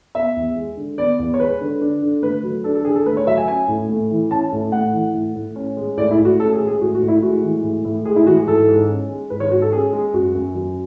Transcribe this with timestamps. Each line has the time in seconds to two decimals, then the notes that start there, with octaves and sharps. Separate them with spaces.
0.15 B3 E5
0.36 E2
0.56 G#3
0.77 D3
0.98 B3 D5
1.19 E2
1.34 C#5
1.40 G#3 B4
1.61 D3
1.81 D4
2.02 D3
2.23 A3 B4
2.43 F#3
2.64 D4 A4
2.75 A4
2.85 D3 G#4
2.95 A4
3.06 A3 B4
3.17 C#5
3.27 F#3 E5
3.37 G#5
3.48 C#4 G#5
3.68 A2
3.89 A3
4.11 E3
4.31 C#4 A5
4.52 A2
4.72 A3 F#5
4.93 E3
5.14 A2
5.35 A2
5.56 C#4
5.77 G#3
5.97 A2 D5
6.11 E4
6.19 A2
6.25 F#4
6.39 C#4 A4
6.53 G#4
6.60 G#3
6.67 G#4
6.81 A2 F#4
6.95 F#4
7.02 A2
7.08 E4
7.22 G#3 F#4
7.43 E3
7.63 A2
7.85 A2
8.05 G#3 G#4
8.16 E4
8.27 E3 F#4
8.37 G#4
8.47 G#2 A4
8.68 G#2
8.89 C#4
9.09 G#3
9.30 G#2 B4
9.40 C#5
9.52 G#2 F#4
9.62 A4
9.72 C#4 G#4
9.93 G#3
10.13 F#2 F#4
10.35 F#2
10.55 F#3